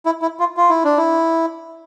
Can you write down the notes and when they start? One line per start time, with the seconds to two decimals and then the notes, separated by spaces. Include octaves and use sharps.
0.06 E4
0.22 E4
0.40 F4
0.57 F4
0.70 E4
0.84 D4
0.97 E4